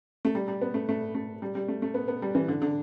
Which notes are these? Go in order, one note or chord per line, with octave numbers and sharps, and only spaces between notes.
A3
G3
G3
B3
A3
A3
A3
G3
G3
A3
A3
B3
B3
G3
E3
D3
D3